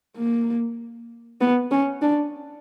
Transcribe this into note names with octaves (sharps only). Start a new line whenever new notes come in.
A#3
B3
C#4
D4